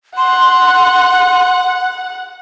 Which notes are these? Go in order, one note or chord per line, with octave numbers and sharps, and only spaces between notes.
F#5 C6